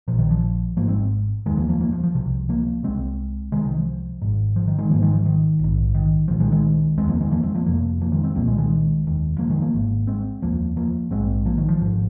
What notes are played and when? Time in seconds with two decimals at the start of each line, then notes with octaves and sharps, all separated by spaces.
0.08 A#1 A#2 F3
0.19 D#3
0.31 F3
0.77 G#1 G#2 F3 A#3
0.88 G#3 C4
1.46 F1 D#2 D#3 G#3
1.57 F3 A#3
1.69 F3 A#3
1.80 F3 A#3
1.92 F3
2.03 F3
2.15 C2 C3
2.49 F3 A#3
2.83 C2 C3 G#3 C4
3.52 C2 C3 D#3 G#3
3.65 D#3
3.76 F3
4.22 G#1 G#2
4.56 F3
4.68 D#3
4.78 D#3 G#3
4.90 G#1 G#2 F3 A#3
5.02 D#3 G#3
5.13 F3
5.26 D#3
5.59 A#1 G#2
5.95 D#3
6.28 C2 A#2 F3
6.40 D#3 G#3
6.52 D#3 G#3
6.97 F1 D#2 G#3 C4
7.09 F3 A#3
7.21 D#3 G#3
7.31 F3 A#3
7.43 G#3 C4
7.55 F3 A#3
7.66 F1 F2 C3 F3 A#3
8.01 F3 A#3
8.12 D#3 G#3
8.23 G#3 C4
8.35 C2 A#2 F3 A#3
8.46 D#3 G#3
8.58 D#3 G#3
9.04 F1 D#2
9.38 F3 A#3
9.50 D#3 G#3
9.61 F3 A#3
9.73 G#1 G#2
10.07 G#3 C4
10.42 F1 D#2 F3 A#3
10.77 F3 A#3
11.11 A#1 G#2 G#3 C4
11.45 F3 A#3
11.58 D#3
11.69 F3
11.80 G#1 G#2